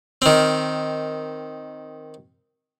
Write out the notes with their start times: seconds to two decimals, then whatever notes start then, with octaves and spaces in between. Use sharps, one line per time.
0.22 D#3 C4